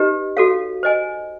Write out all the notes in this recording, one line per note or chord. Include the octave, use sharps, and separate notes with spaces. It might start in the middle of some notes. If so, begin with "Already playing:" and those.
Already playing: D#4 G4 B4 D#5
F#4 A4 C#5 F5
C5 D#5 G#5